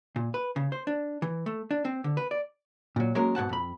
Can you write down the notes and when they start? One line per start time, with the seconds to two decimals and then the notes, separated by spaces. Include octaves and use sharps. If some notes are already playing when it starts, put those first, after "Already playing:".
0.16 A#2
0.34 B4
0.56 C#3
0.72 C5
0.87 D4
1.22 E3
1.46 A3
1.71 D4
1.85 C4
2.04 D3
2.17 B4
2.31 D5
2.96 A#2 F#3
3.15 F#3 G#3 A#3 C#4 A#4
3.35 G#2 B2 F#5 A5
3.49 F2 B5